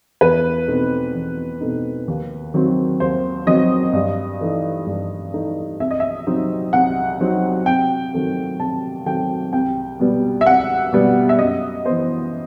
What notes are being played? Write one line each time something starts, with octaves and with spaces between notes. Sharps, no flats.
E2 B4
B2 A3 C4 D#4
E2
B2 A3 C4 D#4
D#2
D#3 F#3 C4
D#2 C5
D#3 F#3 C4 D#5
G2
E3 A3 D#4
G2
E3 A3 D#4
C2 E5
D#5
E5
C3 F#3 C4 D#4
C2 F#5
C3 F#3 C4 D#4
C3 G5
D#3 F#3 A3 C4
C3 A5
D#3 F#3 A3 C4 G5
C2 G5
B2 G3 B3
E5
C2 F#5
B2 G3 B3
E5
F#2 D#5
E3 B3 C5